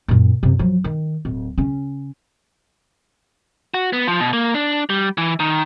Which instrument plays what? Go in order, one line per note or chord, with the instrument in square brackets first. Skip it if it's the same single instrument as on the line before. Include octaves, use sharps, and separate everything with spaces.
[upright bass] F#2 A#2
F#2 C3
F3 F#3
D#3
D1
C#3 C#4
[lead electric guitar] F#4
B3
F3
B2
A#3
D4
G3
E3
D#3